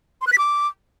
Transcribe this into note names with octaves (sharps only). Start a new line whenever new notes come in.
C6
F#6
B6
D6